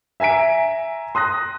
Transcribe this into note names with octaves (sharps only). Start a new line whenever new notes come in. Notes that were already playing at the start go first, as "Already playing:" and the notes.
E5 G#5 A#5 B6 D7
C6 D#6 F#6 A#6